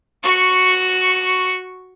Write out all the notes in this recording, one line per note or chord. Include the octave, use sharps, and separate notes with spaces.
F#4 C#6